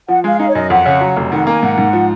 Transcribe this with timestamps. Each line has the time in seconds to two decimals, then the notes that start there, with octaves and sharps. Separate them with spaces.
0.08 F3 F#5
0.24 G#3 F5
0.40 D#4 F5
0.49 C#5
0.55 F#2 D#5
0.70 F2 F#5
0.86 C#3
1.01 F#3
1.16 F1
1.31 D#3 F#5
1.47 A#3 G#5
1.62 G#2 F#5
1.78 G#2
1.93 F3